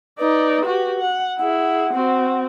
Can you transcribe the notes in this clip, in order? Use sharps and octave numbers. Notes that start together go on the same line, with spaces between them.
D#4 B4 D5
F#4 G4
F#5
E4 G#4 F#5
C4 F#4